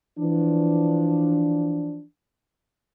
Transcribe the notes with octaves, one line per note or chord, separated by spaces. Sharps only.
E3 F3 D4